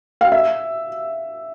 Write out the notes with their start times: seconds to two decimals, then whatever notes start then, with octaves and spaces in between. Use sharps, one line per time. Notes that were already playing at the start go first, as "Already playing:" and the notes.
0.21 F5
0.32 E5